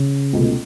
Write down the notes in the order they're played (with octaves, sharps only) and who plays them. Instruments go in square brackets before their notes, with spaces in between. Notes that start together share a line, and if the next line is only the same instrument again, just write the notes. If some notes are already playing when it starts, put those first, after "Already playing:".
Already playing: [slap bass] C#3
[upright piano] C#2 B2 A3